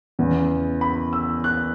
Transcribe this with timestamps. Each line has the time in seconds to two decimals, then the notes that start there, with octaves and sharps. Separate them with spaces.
0.19 E2 C#3 E3
0.81 B5
1.13 E6
1.44 F#6